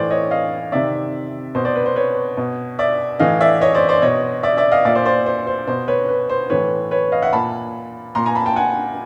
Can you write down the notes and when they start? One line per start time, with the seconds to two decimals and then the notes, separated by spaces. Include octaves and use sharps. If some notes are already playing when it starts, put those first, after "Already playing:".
Already playing: A2 E3 C5 D5
0.10 C#5 D#5
0.31 D#5 F5
0.72 C3 D#3 D5 E5
1.55 B2 C5
1.65 C5 D5
1.76 B4
1.86 C5
1.96 B4 C#5
2.37 B2
2.79 D5 E5
3.19 A2 E3 D#5 F5
3.41 D5 E5
3.61 C#5 D#5
3.75 C5 D5
3.89 C5 D5
4.02 B2 C#5 D#5
4.43 D5 E5
4.57 D5 E5
4.72 D#5 F5
4.85 A#2 D5 E5
4.95 C5 D5
5.05 C5 D5
5.26 C5
5.47 C5
5.67 B2 C5
5.88 B4 C#5
6.09 B4
6.29 C5
6.50 A2 E3 B4 C#5
6.91 B4 C#5
7.12 D#5 F5
7.22 E5 F#5
7.33 A#2 A5 B5
8.15 A#2 A#5 C6
8.26 G#5 A#5
8.35 A5 B5
8.46 G5 A5
8.56 F#5 G#5